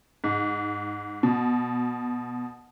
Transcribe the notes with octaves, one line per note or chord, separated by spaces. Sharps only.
G#2
B2